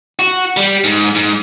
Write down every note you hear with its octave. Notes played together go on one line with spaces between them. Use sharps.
F#4
G3
G#2
G#2